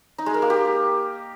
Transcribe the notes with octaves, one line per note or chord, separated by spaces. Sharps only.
D#4
G#3
A#4
A#3
G4